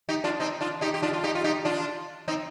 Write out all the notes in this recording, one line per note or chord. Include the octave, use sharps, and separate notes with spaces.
D#4 G4
D4 F4
C4 D#4
D4 F4
D#4 G4
G4
D4 F4
F4
D#4 G4
F4
D#4 G4
D4 F4
C4 D#4